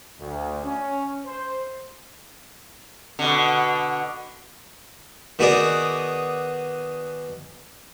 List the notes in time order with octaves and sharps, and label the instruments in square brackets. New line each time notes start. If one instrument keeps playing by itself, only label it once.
[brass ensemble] D2
C#4
C5
[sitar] B2 D3
[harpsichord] D#3 B3 F#4 G#4 D5 D#6